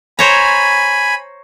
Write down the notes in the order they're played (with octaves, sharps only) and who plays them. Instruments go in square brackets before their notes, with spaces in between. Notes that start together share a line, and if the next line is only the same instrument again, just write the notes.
[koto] C5 C#5 A#5 [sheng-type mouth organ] G#5 B5